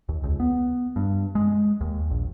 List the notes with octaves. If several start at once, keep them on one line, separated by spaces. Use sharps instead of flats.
D#2
C#2
B3
G2
G#3
D#2
A#1